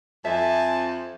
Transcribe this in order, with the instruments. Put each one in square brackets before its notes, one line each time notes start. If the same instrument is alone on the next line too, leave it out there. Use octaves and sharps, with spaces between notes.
[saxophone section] F2 [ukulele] E5 [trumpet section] G#5 A5